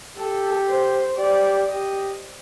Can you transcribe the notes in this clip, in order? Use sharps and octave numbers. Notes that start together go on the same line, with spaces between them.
G4 A4
C5
G4 D5
G4 D#5